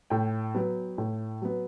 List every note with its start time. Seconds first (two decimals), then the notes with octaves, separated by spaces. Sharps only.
0.10 A2 G5
0.55 F#3 B3
0.98 A2
1.42 F#3 B3